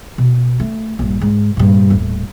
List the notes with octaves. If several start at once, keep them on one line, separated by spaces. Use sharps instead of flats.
B2
A3
A#1 G2
G#2
G2 A#2
D#1 A2